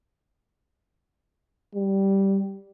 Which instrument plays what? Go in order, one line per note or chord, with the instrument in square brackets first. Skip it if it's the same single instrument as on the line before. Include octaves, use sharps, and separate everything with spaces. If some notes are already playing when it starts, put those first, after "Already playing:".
[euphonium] G3